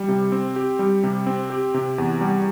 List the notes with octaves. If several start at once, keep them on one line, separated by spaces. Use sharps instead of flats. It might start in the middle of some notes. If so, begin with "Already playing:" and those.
Already playing: G3
C3
C4
G4
G3
C3
C4
G4
C3
E2
G3